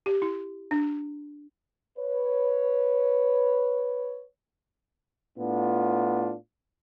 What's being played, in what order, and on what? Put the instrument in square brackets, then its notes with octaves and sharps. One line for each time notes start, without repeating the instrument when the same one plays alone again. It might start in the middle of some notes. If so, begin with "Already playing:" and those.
[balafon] G4
E4
D4
[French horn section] B4 C#5
[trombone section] A2 B3 D4 F4